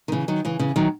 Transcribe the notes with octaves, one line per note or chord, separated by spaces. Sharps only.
D#3
C#3 E3
D#3 F#3
C#3 E3
C#3 E3
D#3 F#3